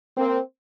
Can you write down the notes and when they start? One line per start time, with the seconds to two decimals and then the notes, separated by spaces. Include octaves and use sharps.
0.17 A#3 C4